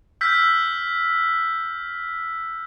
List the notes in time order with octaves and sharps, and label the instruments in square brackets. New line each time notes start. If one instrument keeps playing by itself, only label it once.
[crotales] E6 F6 G6 B6